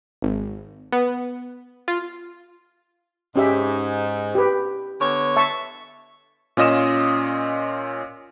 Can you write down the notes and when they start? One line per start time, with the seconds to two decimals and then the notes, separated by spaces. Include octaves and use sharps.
0.22 G#1
0.92 B3
1.88 F4
3.36 G#2 C#4 G4 E5
4.35 G4 B4
5.01 D3 B3 C#5
5.36 E5 A5 C#6
6.57 A#2 C#4 F4 D#5 D#6 E7